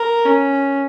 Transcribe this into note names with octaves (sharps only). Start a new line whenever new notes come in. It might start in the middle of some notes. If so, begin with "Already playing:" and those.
Already playing: A#4
C#4